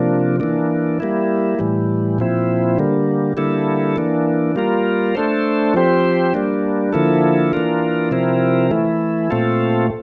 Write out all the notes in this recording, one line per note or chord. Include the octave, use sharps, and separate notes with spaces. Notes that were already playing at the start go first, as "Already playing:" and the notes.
Already playing: C3 F3 A#3 D4
E3 A#3 D4
G3 A#3 E4
A2 E3 G3
A#2 F3 C4 E4
D3 G3 A#3
D3 G3 A#3 E4 A4
E3 A#3 D4
G3 A#3 F4 A#4
A3 D4 A4 C5
F3 C4 G4 C5
G3 A#3 D4
D3 F3 A#3 E4 A4
E3 A#3 D4 F4 A#4
C3 F3 C4 E4 A#4
E3 A3 E4
A#2 A3 C4 F4 A4